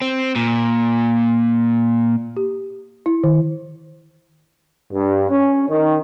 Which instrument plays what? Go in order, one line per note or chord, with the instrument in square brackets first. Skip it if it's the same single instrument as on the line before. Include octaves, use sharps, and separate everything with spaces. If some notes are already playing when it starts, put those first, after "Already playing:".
[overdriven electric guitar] C4
A#2
[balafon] G4
E4
D#3
[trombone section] G2
C#4
D#3